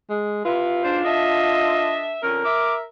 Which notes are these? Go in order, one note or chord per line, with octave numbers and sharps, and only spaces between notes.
G#3
C3 E4 F4 B4
G#2 B2 D4 C5
D4 A4 D#5 E5
F2 D3 C#4 A#4
E5 D6